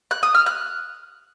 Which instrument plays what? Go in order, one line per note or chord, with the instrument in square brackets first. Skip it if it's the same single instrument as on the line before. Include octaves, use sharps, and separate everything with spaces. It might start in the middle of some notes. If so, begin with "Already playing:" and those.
[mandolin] F#6
D#6
F6
F#6